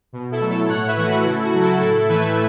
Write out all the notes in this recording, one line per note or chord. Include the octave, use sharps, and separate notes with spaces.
B2
E4 A4
F#3 A3
A4 C#5
A2 C#5 F#5
B4 E5
E3 A3
F#4 B4
C#3 E4 A4
F#4
F#3 A3
E4 A4
A2 E4 A4
E3 A3 B4 E5